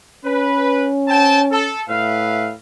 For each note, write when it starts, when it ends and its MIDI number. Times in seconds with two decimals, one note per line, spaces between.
0.25 1.73 61
0.25 0.87 71
1.08 1.40 60
1.08 1.40 79
1.08 1.40 81
1.52 1.81 69
1.88 2.54 45
1.88 2.52 71
1.88 2.52 76
1.88 2.52 77